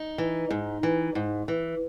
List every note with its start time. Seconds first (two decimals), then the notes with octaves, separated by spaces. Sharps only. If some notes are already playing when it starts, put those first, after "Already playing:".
Already playing: D#4
0.18 E3
0.50 G#2
0.83 E3
1.15 G#2
1.48 E3